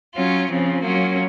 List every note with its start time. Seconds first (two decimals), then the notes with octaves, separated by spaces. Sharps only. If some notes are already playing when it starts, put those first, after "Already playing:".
0.14 F#3 C#4 F4
0.47 C#3 F3 C4
0.82 F#3 A#3 C#4 F4